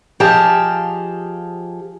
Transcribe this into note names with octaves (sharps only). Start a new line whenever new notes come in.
F3 G4 G#4 D#5 F5 A5